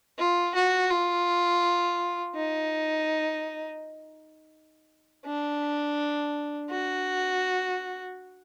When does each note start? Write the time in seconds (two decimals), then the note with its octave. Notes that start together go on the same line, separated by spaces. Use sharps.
0.18 F4
0.55 F#4
0.90 F4
2.35 D#4
5.25 D4
6.70 F#4